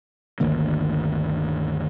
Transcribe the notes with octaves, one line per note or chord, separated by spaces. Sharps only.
G1 D2 D#3 A#3